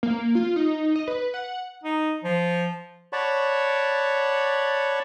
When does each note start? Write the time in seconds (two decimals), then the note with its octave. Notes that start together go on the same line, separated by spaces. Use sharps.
0.03 A#3
0.35 F4
0.56 D#4
0.96 D#5
1.08 B4
1.34 F#5
1.84 D#4
2.24 F3
3.13 C#5 D5 F#5 A5 B5 C#6